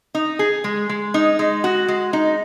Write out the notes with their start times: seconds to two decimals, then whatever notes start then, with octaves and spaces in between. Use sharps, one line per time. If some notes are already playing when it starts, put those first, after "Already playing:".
0.14 D#4
0.39 G#4
0.64 G#3
0.89 G#3
1.14 D#4
1.39 G#3
1.64 F#4
1.88 G#3
2.13 D#4